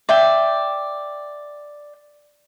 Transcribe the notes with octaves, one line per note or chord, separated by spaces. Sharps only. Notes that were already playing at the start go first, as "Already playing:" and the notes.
D5 E5 G5